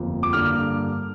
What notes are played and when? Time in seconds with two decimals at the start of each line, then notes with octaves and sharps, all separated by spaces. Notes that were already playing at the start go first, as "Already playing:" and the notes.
Already playing: G1 F2 F3 A#3
0.23 D6
0.33 G2 D3 A#3 F6